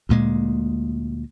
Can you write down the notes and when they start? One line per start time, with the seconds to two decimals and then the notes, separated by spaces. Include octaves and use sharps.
0.09 D2 A#2 G#3